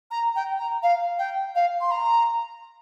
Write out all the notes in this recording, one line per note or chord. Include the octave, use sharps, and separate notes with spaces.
A#5
G5
A#5
F5
G5
F5
C6
A#5